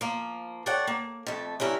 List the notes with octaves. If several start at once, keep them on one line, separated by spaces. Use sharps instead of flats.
F3 A#3
A4 C#5 D5 F#5 G5
A#3
F2 A3
G2 C#4 E4 A#4